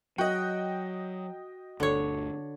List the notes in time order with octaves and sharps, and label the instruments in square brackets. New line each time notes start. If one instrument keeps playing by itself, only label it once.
[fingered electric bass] F#3 [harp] F#4 [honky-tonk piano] D#5 G5
[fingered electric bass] G1 D2 [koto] D3 C#5